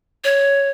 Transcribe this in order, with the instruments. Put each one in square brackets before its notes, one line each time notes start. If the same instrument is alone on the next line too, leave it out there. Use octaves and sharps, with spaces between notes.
[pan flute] C#5